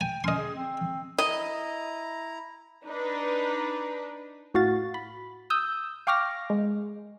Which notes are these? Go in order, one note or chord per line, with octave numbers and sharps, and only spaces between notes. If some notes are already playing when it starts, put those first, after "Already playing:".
G5 G#5
C#4 D#5 C6
G#4
C4
E4 D#5 A#5
D4 D#4 B4
A2 F#4 F5 A6
B5
D#6 E6 G6
F5 G5 C#6 D6 F6 A#6
G#3